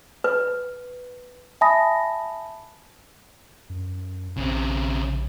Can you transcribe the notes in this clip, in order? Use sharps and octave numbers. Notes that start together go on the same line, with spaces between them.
B4
E5 G#5 A5 B5 D#6 A#6
F#2
A#1 C#3 C4